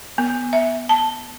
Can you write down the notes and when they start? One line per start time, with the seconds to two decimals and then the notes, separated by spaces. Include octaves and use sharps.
0.18 B3
0.53 E5
0.89 A5